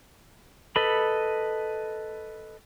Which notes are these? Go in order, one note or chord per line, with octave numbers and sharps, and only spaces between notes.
A4 B4 D#5 B5